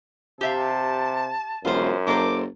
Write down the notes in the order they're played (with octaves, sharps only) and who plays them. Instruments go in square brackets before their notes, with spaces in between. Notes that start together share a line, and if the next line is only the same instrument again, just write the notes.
[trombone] C3 [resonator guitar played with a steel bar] G4 E5 F5 [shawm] A5
[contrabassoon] E1 [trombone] F#2 [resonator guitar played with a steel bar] F4 C5
[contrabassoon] F#1 [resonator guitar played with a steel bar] A4 A#4 C5 [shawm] D6